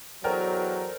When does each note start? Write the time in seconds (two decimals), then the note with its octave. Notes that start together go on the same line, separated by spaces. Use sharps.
0.24 E2 F#3 A4 A#4 C5 D5 G5 F6